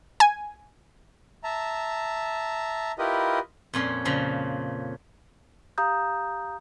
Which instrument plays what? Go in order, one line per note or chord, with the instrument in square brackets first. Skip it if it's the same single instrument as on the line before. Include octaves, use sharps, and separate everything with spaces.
[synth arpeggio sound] G#5
[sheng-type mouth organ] E5 A5 A#5
E4 F4 G4 A#4 B4 D#5
[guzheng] F2 A#2 C#4 C6
A#2 C#3 F3
[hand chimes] G4 F5 A#5 D#6 G6